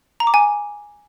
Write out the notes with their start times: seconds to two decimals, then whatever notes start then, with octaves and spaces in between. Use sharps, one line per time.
0.20 A#5
0.27 D6
0.34 G#5